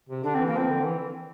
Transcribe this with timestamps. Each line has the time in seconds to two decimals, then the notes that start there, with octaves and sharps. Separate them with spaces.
0.09 C3
0.24 D3 D4
0.34 E3 C4
0.46 A#3
0.54 F3 C4
0.69 D3
0.84 E3